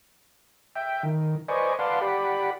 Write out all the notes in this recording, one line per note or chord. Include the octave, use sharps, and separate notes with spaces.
E5 G5
D#3
B4 C5 D5 D#5 G#5 C#6
B4 D5 F5 F#5 A5 C6
G4 D5 F#5 B5